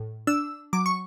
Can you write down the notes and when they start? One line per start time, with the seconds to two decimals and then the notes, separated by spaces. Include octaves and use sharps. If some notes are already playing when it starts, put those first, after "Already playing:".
Already playing: A2
0.27 D4 E6
0.73 F#3 D6
0.86 C#6